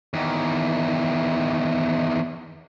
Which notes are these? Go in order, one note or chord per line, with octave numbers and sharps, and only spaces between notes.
E2 D#3